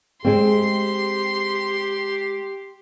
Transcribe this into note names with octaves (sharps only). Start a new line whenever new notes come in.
G#3 C4 G4 C6